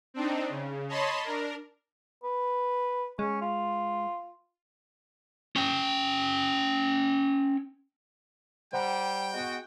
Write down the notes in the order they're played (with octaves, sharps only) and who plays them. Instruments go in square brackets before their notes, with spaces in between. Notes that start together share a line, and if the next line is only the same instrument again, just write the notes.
[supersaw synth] C4 D4 D#4
C#3
C#5 D#5 A5 B5 C6
D4 A#4
[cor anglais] B4
[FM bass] G#3 [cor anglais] C#4
[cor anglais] F4
[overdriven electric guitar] C#4 G5
[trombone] G3 [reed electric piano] C5 F#5 A#5 [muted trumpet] G5
[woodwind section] G#3 B3 F#4